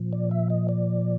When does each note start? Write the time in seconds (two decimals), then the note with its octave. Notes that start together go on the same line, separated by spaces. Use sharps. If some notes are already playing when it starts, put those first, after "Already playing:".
Already playing: A#2 F3
0.13 D5
0.31 E5
0.50 D#5
0.69 D5